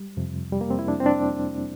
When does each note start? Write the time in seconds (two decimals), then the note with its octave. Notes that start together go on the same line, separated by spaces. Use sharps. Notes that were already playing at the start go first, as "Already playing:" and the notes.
Already playing: G3
0.17 F2 C3 F3
0.52 G3
0.61 A#3
0.70 C4
0.79 E4
0.88 D4
1.00 C4
1.06 D4